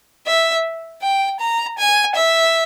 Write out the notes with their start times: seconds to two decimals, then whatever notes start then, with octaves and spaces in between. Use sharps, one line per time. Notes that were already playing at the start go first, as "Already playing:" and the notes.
0.27 E5
1.02 G5
1.40 A#5
1.78 G#5
2.16 E5